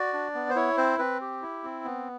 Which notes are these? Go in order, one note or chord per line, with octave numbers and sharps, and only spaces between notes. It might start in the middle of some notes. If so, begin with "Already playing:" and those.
Already playing: F#4 D5
D4
B3
C5
E4 C#5
C4 C5
C4 B4
G4
E4
C4
B3